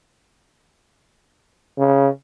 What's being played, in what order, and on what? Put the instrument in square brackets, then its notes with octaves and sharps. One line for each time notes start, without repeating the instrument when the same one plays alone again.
[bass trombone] C#3